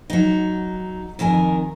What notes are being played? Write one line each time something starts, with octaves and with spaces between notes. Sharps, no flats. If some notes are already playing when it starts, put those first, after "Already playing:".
F#3 D#4
F2 D#3 A#4 G#5